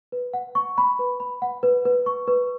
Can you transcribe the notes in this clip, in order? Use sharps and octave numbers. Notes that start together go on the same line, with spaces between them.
B4
F#5
C#6
B5
B4
B5
F#5
B4
B4
C#6
B4